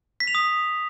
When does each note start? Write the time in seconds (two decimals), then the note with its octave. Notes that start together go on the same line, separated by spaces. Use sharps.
0.20 B6
0.27 F7
0.35 D#6